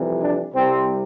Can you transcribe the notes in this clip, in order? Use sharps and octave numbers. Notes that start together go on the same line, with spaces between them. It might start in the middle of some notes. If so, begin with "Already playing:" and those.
Already playing: F2 C3 E3 G3
D4
C2 C3 G3 C4